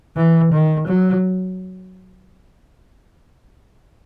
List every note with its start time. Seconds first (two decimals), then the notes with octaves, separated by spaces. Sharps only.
0.16 E3
0.52 D#3
0.88 F#3